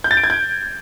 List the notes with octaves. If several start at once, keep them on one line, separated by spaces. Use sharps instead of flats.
G6
A6
D7
G#6
G6